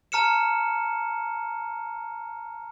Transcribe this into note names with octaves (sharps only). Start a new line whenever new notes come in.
A5 A#5 F6 C#7 E7